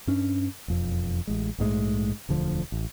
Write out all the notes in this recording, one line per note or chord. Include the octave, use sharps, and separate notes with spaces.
G2 C#4 D4
E1 F2
A1 G#3
A#1 G#2 G#3 A3
E1 D2 D3 F3
A1